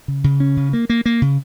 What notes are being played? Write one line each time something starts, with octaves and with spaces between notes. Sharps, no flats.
C#3
C#3
C#4
C#3
A#3
A#3
A#3
C#3